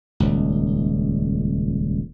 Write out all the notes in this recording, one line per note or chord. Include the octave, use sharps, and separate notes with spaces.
D#1 C#2